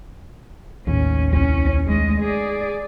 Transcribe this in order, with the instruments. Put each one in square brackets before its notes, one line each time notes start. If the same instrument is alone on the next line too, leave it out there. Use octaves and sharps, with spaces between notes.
[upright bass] A1 [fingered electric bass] D#2 [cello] C#4
[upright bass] C2 E4 [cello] C#4
[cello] G#3 D#5 [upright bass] A3 D#4
[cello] G#4 D5